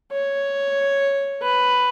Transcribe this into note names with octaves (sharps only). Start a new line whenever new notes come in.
C#5
B4